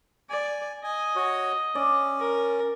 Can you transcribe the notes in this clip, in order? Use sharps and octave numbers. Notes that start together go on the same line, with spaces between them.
D5 G#5
D#5 G#5
F#4 C#5
C#4 D5
A#4